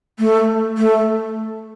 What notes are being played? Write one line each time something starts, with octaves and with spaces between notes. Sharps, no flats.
A3
A3